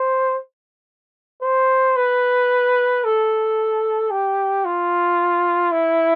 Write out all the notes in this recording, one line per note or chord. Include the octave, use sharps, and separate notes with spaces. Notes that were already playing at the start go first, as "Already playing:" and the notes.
Already playing: C5
C5
B4
A4
G4
F4
E4